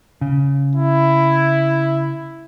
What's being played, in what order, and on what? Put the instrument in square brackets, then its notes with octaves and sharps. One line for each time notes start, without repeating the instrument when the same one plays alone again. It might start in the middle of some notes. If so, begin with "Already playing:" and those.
[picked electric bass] C#3
[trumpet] E4